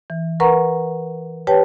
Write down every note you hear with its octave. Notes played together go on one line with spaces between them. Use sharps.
E3
A#4 B4 F#5 A#5 C#6
G4 B4 C#5 G5 A5